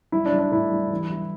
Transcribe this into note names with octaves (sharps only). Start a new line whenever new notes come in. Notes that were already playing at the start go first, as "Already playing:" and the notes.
G3 E4
D4
G3
D4
A2 E4
G3
E3
G3